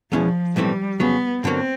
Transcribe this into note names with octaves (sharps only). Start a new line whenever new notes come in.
E2 B2 F3 G#3 C#4 E4
B1 A2 E3 G3 A3 C4
F2 C#3 F#3 B3
G2 D3 F#3 A#3 C4